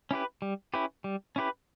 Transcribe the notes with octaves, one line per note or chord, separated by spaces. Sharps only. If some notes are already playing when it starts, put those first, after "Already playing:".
C#4 E4 G4 B4
G3
C#4 E4 G4 B4
G3
C#4 E4 G4 B4